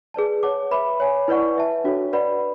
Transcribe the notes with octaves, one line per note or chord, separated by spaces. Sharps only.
G#4 B4 D5 A5
C#5 F#5 A5 D6
B4 E5 B5 D6
C#5 G#5 B5
E4 B4 D5 F#5 C#6
B4 E5 A5
D4 F#4 A4 C#5
B4 D5 F#5 B5